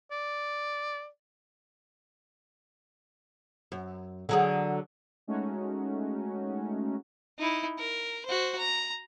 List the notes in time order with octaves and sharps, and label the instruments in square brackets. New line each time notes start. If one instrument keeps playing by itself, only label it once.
[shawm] D5
[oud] F#2
D3 F#3 G#4
[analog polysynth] G#3 A3 C#4 D#4 F#4
[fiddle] D#4 E4
A#4
F#4 C5
A#5